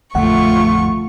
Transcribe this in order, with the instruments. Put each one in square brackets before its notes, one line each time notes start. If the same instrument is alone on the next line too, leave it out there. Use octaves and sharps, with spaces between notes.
[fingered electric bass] A1 F2 D3 [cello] A3 F4 [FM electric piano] F#5 [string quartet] C#6